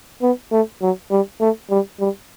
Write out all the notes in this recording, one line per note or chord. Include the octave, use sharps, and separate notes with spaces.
B3
A3
F#3
G3
A3
G3
G3